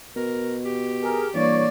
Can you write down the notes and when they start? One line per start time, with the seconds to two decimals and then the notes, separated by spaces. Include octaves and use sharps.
0.16 B2 A#4
0.65 G4
1.02 G#4 A#4
1.34 G2 E3 A#3 C#5 D5